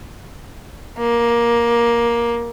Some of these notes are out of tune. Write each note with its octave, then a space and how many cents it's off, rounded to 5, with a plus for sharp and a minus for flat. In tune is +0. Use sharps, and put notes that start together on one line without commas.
A#3 +15